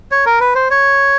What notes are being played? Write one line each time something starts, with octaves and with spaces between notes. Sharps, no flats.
C#5
A#4
B4
C5
C#5